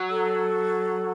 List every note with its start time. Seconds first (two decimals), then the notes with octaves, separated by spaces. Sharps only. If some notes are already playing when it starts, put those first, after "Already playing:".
Already playing: F#3
0.10 A4